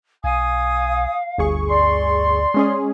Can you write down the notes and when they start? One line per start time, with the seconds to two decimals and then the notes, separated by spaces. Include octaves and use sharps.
0.24 B1 F5 G#5 D#6
1.38 G1 D2 G#4 C#6
1.69 D5 C6
2.54 G#3 C#4 G#4